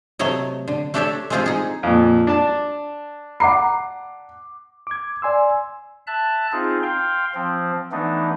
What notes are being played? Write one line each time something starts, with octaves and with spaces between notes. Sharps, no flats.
C3 F#3 A3 C#5 D#5
D3
A3 D4 G4 A4 C#5 E5
G#3 A3 C4 F4 G4 G#4
D#4 G#4
F2 A#2
D4 A5
F#5 A#5 B5 D6 C7
D6 G#6
D5 G#5 C6 E6
E5 A5 F#6
C4 D#4 F4 G#4
F5 G5 C6
F3 C4
E3 A3 B3 D4 D#4